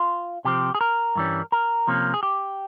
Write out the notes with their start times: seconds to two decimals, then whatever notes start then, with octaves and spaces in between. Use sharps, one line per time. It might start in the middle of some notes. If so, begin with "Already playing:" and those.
Already playing: F4
0.45 C3 F3 C4 G4
0.75 G#4
0.81 A#4
1.16 G2 E3 G3 C#4
1.52 A#4
1.87 C3 F3 A#3 C#4
2.14 G#4
2.23 G4